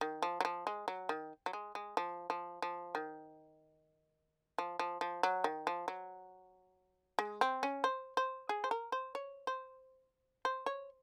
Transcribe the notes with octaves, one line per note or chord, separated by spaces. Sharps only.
D#3
F3
F#3
F3
G#3
F#3
D#3
F#3
G#3
G#3
F3
F3
F3
D#3
F3
F3
F3
F#3
D#3
F3
F#3
G#3
C4
C#4
C5
C5
G#4
C5
A#4
C5
C#5
C5
C5
C#5